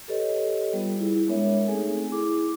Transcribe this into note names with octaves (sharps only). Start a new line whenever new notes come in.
G4 A4 B4 C#5 D#5
G3 B3 F4
E4 G#4
G#3 B3 D4 A#4 C#5 E5
A3 C4 D#4 G#4 A4 G#5
E4 G#4 D6